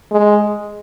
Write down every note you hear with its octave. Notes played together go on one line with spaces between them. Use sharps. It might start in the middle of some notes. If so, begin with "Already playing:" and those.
G#3